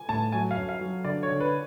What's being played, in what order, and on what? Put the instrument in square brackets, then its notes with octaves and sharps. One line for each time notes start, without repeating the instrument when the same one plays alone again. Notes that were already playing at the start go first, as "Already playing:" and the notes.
Already playing: [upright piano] G#5
[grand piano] A2 [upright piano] A5
[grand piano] F#3 [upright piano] G#5
[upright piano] F5
[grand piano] F#2
[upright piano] F5
[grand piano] F#3
[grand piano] D3 [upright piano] D5
[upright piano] C#5
[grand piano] D3
[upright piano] B4